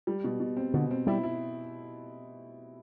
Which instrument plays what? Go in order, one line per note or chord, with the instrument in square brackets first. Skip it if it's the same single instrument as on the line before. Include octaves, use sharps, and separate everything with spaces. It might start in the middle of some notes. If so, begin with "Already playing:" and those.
[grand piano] G3
B2
B2
C4
[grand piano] B2 [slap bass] D3
[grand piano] C4
[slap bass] G3 [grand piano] E4
[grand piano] E4